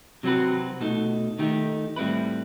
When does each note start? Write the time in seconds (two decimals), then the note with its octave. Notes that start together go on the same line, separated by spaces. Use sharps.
0.23 C3 F#3 C4 F#4 B4
0.81 B2 A3 D#4
1.39 D#3 A3 D#4 G4
1.96 A2 G3 C4 E4 B4